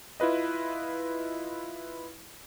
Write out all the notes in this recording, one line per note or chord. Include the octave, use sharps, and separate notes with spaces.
E4 F4 B4 D#5